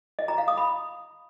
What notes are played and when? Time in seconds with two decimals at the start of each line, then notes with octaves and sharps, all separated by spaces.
0.19 D#5
0.28 A#5
0.38 F5
0.48 D#6
0.57 B5